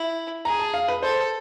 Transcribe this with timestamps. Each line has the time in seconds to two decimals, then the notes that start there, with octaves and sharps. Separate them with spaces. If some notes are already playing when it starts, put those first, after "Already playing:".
Already playing: E4
0.45 G#4 A#5
0.59 A5
0.74 F5
0.88 B4
1.02 A4 C5